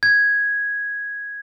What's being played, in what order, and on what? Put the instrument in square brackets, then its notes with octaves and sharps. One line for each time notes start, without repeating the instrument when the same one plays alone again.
[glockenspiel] G#6